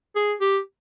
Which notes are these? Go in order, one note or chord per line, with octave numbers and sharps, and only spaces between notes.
G#4
G4